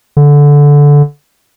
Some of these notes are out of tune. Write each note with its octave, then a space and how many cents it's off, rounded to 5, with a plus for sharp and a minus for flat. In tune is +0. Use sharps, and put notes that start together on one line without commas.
D3 -15